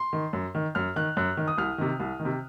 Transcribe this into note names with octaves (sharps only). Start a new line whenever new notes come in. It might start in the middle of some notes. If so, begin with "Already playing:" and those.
Already playing: C6
D#3
F#2
D#3
F#2 F6
D#3 F#6
F#2 F#6
D#3
D#6
C2 F6
C3 D#3
C2
D#3
C3